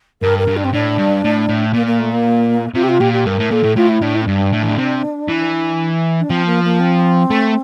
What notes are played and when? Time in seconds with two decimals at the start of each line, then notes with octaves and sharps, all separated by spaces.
0.21 G2 A#4
0.39 A#4
0.47 G2
0.56 D4
0.64 C4
0.73 A2 D4
0.98 G2
1.24 A2
1.49 A2
1.74 A#2 A#3
1.86 A#3
1.99 A3
2.12 A#3
2.75 C3 F4
2.83 G4
2.88 F4
3.00 A#2 G4
3.13 G4
3.25 G2 A#4
3.39 A2
3.51 A#2 A4
3.64 A2
3.76 A2 F4
3.89 E4
4.02 A2 D4
4.15 E4
4.22 C4
4.27 G2 D4
4.53 A2
4.63 E3
4.70 D3
4.78 C3
5.28 E3
6.20 D4
6.29 F3 C4
6.46 A#3
6.64 A#3
6.80 C4
7.30 A3